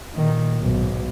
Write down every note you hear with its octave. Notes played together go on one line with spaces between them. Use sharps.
A#2 D#3
B1 G#2